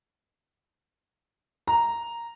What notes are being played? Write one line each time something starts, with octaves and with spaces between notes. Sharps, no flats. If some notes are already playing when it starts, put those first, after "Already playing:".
A#5